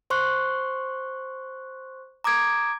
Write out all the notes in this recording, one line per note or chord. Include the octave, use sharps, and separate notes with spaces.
C5 C6 C#6 F#6
A#5 D6 D#6 G#6 D7